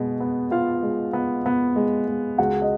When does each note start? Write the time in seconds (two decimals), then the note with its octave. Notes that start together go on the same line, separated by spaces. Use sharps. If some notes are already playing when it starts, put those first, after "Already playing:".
Already playing: B2 G#3 B3
0.20 B3
0.51 B3 F4 F5
0.83 G#3
1.13 B3
1.46 B3
1.76 G#3
2.07 G#3
2.38 C#2 F#4 F#5
2.62 D#5